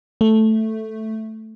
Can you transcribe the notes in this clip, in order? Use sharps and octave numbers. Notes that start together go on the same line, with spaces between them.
A3